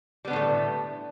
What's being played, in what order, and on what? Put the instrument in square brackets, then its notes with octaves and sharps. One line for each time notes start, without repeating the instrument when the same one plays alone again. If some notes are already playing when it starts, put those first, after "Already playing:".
[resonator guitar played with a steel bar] G3
B3
D3
A2
A3